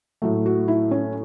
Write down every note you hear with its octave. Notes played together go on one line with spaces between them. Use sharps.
A2 F#3 A3
F#4
E4
C#4